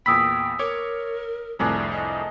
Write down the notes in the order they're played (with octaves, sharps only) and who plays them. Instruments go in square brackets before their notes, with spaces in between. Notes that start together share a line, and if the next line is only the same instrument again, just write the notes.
[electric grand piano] E2 A#2 B5 [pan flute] G5 [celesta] D#6 E6 B6
[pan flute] A#4 [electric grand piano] C#5 D6
[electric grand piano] C2 F2 A2 [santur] D4 G#4 A#4
[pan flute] D#5